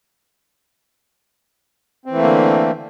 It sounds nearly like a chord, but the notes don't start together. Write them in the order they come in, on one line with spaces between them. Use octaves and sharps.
C4 E3 A3 A#3 D3